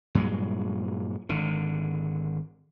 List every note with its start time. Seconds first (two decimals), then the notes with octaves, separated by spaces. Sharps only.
0.15 G2 A#2 F#3 G#3
1.29 G#1 D3